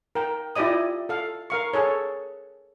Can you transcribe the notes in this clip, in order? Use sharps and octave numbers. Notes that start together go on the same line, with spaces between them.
A#4 G5
E4 F4 G4 D5 D#5 D#6
A4 F5
A#4 F5 C#6
G#4 A4 C#5